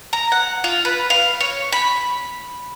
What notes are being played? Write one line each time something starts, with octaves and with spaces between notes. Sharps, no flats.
A#5
F#5
F4
B4
F5
C#5
B5